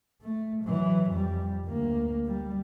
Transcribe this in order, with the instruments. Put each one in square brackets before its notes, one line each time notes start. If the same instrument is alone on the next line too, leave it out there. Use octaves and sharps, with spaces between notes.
[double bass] A3
E3 F#3
F2 G3
D2 A#3
G3